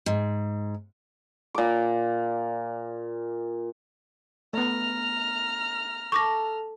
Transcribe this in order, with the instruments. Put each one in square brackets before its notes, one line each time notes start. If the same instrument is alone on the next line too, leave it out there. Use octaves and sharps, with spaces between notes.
[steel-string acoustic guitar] G#2
[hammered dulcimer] A#2 D6
[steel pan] A3 B3 [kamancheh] A#5 F6
[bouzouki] A4 [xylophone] C#6 D6 A#6